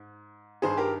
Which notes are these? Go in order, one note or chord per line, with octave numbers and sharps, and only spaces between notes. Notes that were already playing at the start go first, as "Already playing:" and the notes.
Already playing: G#2
G2 D#3 G#4 C5
G4 A#4